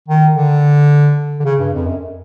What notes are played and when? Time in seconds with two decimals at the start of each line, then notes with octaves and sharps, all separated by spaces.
0.08 D#3
0.35 D3
1.40 D3
1.45 C#3
1.60 G2
1.73 F2
1.86 F#2